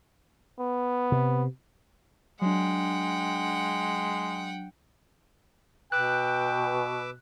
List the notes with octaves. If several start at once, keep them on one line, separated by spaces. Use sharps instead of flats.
B3
C3
F#3 G#3 D4 F#5 G5
B2 B4 G5 D6 E6 F#6